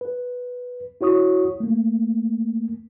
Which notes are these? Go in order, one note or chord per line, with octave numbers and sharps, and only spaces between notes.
B4
E4 F#4 C#5 C#6 D#6
A3 A#3